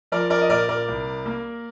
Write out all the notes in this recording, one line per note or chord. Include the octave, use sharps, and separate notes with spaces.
F3 A#4 D5
A#4 D5
D#5
A#2 A#4 D5
A#4 D5
C2
A#3